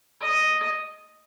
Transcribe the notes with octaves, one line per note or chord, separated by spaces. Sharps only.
D#5